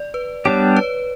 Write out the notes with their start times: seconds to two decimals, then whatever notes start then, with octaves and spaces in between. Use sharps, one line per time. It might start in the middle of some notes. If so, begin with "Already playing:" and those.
Already playing: D5
0.14 B4
0.45 G3 B3 D4 G4 C#5
0.76 B4